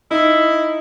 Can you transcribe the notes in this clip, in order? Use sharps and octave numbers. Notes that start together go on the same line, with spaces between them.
D#4 E4